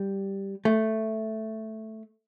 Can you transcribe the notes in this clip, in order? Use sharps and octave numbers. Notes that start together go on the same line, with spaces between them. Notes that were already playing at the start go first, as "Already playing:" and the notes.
Already playing: G3
A3